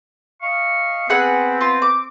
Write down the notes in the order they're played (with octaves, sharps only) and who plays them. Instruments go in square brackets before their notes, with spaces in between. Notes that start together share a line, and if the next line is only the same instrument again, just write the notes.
[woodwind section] D#5 F5 C#6
[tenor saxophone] B3 [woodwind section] C4 [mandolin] G#4 B4 F#5
[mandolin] F4
D6